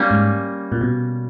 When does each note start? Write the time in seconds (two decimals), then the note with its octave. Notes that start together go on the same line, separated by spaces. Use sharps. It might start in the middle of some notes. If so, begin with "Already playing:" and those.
Already playing: G3 A#3 C#4
0.11 G#2
0.72 A#2
0.81 B2